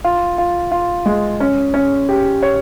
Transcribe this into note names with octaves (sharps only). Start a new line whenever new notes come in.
F4
F4
F4
G#3
C#4
C#4
G4
C#5